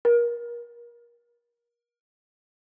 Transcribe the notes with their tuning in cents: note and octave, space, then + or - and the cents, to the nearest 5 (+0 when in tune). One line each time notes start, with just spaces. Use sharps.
A#4 +30